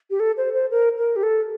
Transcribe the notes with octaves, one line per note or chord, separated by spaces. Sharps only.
G4
A4
C5
C5
A#4
A#4
G4
A4